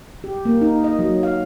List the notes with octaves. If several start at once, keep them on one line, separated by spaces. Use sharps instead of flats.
G4
A#3
D#4
D#5
F#3
F5